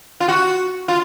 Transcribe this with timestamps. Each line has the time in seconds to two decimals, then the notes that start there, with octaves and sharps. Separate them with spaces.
0.20 F4
0.28 F#4
0.88 F4